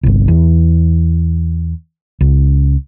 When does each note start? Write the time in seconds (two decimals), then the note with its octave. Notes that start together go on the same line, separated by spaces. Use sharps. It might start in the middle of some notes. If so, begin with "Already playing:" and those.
0.03 G1 C2
0.28 E2
2.21 C#2